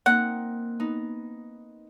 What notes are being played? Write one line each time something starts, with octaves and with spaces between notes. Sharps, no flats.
A#3 C4 D#4 F#5
B3 D#4